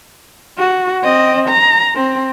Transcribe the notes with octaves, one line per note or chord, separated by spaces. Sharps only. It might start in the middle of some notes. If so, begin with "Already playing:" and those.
F#4
C4 D#5
A#5
C4